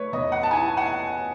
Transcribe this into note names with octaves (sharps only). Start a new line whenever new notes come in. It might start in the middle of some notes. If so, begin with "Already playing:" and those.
Already playing: A3 B4 C#5
E2 D#5
F#5
A5
E4 G#5
F#5